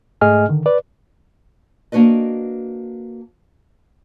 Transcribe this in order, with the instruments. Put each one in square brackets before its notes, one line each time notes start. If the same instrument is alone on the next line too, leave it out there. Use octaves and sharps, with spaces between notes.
[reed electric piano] G#2 A3 G#4 D#5 G#5 F6
D3 D#3
B4 D5
[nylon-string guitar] A#3 D4 F#4 B4 D#5